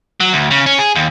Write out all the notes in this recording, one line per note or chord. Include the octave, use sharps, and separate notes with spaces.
F#3
D2
C#3
C#4
G#4
D#2